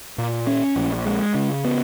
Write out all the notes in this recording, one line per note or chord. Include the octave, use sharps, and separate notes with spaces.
A#2
C#4
A#1
G#3
C#3
B3